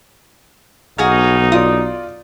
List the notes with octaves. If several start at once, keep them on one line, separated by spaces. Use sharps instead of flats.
B1 D#4 F#4 G#4 F5
F4 D5 D#6